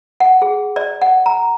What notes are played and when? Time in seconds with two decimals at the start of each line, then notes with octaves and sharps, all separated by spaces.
0.20 F#5
0.42 G#4
0.76 D5
1.02 F#5
1.26 A#5